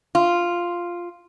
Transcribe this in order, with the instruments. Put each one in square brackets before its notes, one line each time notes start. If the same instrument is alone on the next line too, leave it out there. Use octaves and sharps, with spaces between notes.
[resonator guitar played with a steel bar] F4